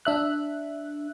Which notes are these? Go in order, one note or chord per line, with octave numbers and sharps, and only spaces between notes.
D4 E5 F#6